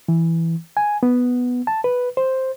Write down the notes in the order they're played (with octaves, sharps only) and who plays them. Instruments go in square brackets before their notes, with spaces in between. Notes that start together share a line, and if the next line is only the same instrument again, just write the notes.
[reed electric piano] E3
G#5
B3
A5
B4
C5